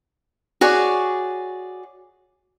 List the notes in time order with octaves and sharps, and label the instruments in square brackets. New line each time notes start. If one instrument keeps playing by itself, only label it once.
[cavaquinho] F#4 G#4 C#5 D5